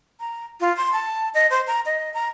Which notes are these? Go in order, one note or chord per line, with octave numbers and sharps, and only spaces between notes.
A#5
F4
C6
A5
D#5
C5
A#5
D#5
A#5